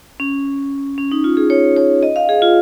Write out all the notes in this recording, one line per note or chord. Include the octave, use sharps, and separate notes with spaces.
C#4
C#4
D#4
F4
G#4
C#5
C#5
D#5
F5
G#4
F4